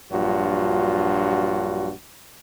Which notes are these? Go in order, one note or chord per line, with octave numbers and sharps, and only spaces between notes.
A#1 G2 F#3 F4 F#4